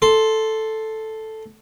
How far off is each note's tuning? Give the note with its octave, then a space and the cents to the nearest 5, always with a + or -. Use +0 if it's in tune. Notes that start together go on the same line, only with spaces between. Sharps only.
A4 +0 C6 +5